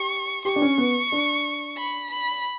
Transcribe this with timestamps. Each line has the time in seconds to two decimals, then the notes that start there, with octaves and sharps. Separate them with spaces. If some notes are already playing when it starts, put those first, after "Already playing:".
Already playing: G4 C#6
0.45 G4 C#6
0.56 D4
0.62 C#4
0.78 B3
1.12 D4
1.77 B5
2.11 B5